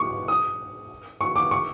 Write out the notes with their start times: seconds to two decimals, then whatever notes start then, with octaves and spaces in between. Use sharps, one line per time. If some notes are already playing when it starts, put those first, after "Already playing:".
Already playing: C#6 D6
0.28 D#6
1.21 C#6
1.36 D6
1.51 C#6